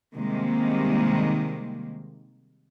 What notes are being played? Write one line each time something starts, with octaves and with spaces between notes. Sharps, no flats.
C3 D#3 G3 G#3 A#3